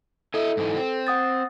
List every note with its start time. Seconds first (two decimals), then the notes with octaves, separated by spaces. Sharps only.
0.34 E4 A4 D#5
0.57 G#2 E3
0.77 C4
1.07 F#5 D#6 A6